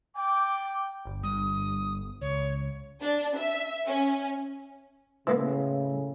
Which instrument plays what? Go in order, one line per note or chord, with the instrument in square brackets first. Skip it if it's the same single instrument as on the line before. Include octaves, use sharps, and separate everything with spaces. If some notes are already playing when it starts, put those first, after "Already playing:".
[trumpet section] G5 [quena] D6
[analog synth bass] G1
[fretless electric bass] G2 [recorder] D#6
[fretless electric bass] C#2 [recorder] C#5
[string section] D4
E5
C#4
[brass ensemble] A2 C#3 [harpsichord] E3 A#3 B3